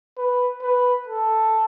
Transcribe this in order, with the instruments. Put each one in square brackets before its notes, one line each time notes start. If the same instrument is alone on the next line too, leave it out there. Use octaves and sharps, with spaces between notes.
[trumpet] B4
B4
A4